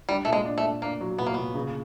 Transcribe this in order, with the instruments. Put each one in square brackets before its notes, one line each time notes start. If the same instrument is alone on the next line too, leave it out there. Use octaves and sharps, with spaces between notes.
[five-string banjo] G3 [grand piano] D4
[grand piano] A#2 [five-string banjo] A3
[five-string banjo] G#3
[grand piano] D4
[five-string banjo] A3
[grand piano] D4
[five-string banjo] A#3 [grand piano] D4
[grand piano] F#3
[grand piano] A#2 [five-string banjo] B3
[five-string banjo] A#3
[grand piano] A#2 [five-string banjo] B3
[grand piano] C#3